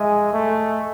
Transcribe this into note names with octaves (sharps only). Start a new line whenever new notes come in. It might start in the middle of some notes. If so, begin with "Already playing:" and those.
Already playing: G#3 D#5 E5 G#5
A3